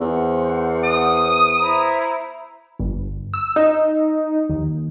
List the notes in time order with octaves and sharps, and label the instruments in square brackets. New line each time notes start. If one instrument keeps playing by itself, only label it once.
[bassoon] E2 [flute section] C5 F#5
[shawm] D#6
[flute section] E4 C5 A#5
[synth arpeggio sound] G1
E6
D#4
D#2